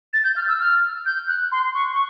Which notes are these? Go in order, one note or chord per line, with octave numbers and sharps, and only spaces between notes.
A6
G6
F6
E6
F6
G6
F#6
C6
C#6
C#6